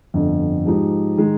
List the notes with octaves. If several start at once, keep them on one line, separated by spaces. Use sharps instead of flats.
G1 F2 D3
G#2 F3 G#3 D#4 G4
D#3 G#3 D#4